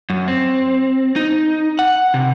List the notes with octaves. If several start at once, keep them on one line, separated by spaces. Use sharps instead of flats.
F#2
C4
D#4
F#5
C3